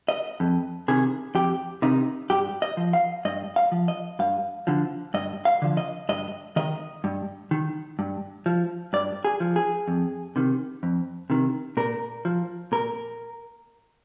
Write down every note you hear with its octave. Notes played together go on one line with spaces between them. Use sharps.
D#5
F2
C3 D#3 G#4
F2 G4
C3 D#3 D#4
G2 G4
D#5
F3
F5
G2 D#5
F5
F3
D#5
G2 F5
D3 F3
G2 D#5
F5
D3 F3
D#5
G2 D#5
D#3 D#5
G2
D#3
G2
F3
G2 D5
G#4
F3
G#4
F2
C3 D#3
F2
C3 D#3
A#2 A#4
F3
A#2 A#4